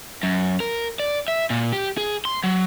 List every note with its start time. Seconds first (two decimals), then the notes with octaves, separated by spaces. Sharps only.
0.23 F#2
0.60 A#4
0.99 D5
1.28 E5
1.50 A#2
1.73 G4
1.97 G#4
2.25 C6
2.44 F#3